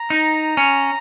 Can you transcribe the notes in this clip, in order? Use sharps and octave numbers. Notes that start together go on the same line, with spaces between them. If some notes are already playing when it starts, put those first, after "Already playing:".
Already playing: A#5
D#4
C#4